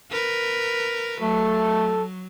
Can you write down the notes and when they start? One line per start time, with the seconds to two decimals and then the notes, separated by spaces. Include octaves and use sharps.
0.11 A#4 B4
1.22 F#3 A3 A4